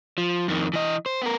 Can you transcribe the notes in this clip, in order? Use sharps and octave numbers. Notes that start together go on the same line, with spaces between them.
F3
F2 D#3
E3 D#5
C5
B3 A#4